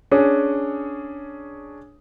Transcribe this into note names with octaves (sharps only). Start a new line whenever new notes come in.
C#4 D4 G#4 C#5